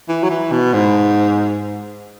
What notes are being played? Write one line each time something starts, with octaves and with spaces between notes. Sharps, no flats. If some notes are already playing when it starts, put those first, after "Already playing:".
E3
F#3
E3
B2
G#2